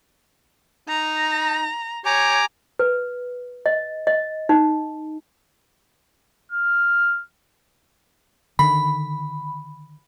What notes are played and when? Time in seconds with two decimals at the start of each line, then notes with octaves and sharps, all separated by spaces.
0.88 D#4 A#5
2.06 G4 C#5 G#5 A#5 D6
2.79 B4
3.66 D#5
4.07 D#5
4.49 D#4
6.52 F6
8.59 D3 D#3 B5